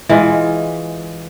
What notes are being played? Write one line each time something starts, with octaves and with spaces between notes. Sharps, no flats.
E3 G#3 F4